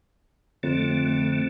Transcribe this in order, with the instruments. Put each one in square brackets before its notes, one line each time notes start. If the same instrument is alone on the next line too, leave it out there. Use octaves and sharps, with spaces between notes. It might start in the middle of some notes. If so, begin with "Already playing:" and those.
[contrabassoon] F2 [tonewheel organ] D3 A3